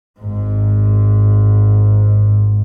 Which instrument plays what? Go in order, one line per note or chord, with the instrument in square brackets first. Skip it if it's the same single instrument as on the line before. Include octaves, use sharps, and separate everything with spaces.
[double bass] G#1 G#2